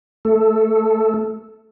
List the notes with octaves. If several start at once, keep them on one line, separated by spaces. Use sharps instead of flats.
A3 A4